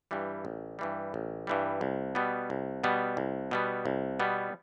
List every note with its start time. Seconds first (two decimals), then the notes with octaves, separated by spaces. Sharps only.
0.11 G2 E3 G3
0.45 A1
0.79 G2 E3 G3
1.14 A1
1.47 G2 E3 G3
1.81 C2
2.15 B2 G3 B3
2.50 C2
2.84 B2 G3 B3
3.17 C2
3.51 B2 G3 B3
3.85 C2
4.20 B2 G3 B3